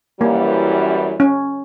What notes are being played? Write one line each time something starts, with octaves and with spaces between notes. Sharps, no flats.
F#2 E3 G3 A#3
C#4